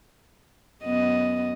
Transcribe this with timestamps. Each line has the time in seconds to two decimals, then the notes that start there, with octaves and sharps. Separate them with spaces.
0.84 F#2 B3 D#5